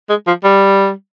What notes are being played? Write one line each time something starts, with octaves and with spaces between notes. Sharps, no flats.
G#3
F3
G3